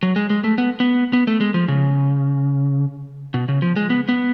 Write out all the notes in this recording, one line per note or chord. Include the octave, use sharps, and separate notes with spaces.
F#3
G#3
G#3
A3
B3
B3
B3
A3
G#3
F3
C#3
B2
C#3
F3
G#3
B3
B3